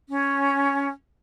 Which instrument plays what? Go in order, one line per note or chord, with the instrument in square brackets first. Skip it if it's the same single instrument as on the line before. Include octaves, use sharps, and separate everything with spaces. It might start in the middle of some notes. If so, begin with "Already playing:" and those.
[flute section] C#4